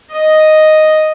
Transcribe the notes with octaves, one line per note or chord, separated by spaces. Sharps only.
D#5